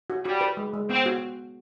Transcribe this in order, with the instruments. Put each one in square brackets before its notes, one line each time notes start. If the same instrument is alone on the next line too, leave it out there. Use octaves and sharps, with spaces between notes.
[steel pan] F#4
[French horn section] G3 [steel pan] F#4
[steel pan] B4
G#3
G#3
[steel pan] B3 [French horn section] C4
[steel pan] F#4